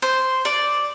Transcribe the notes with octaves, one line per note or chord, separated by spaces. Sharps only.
C5
D5